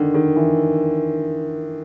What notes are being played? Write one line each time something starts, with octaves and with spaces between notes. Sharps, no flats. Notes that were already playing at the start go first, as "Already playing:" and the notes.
Already playing: D3 D#3
D#3
E3